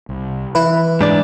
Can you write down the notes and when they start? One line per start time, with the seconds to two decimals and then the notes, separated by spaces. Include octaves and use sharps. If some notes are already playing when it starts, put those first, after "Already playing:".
0.09 C2
0.55 E3 E4 B4
1.01 G#2 D4 D5